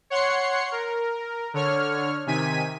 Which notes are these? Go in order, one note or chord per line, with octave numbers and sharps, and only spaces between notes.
C#5 F#5 C6 C7 C#7
A#4
D3 C#5 F6
C3 D#3 G#5 B6 D#7